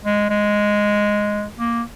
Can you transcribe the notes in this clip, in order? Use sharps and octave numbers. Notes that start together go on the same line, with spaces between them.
G#3
G#3
A#3